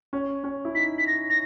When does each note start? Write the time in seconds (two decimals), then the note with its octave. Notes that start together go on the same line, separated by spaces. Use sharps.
0.13 C#4
0.44 C#4
0.65 E4
0.75 D#4 B6
0.98 B6
1.07 A#6
1.30 A#6